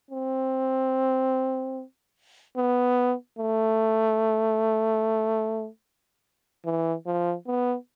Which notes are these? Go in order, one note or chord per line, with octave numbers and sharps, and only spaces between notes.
C4
B3
A3
E3
F3
B3